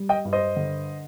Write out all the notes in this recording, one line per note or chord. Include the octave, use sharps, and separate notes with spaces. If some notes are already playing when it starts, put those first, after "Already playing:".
Already playing: G3
D#5 G5
G2
C5 D#5
D3